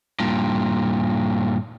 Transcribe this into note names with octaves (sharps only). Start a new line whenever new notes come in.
G2 A#2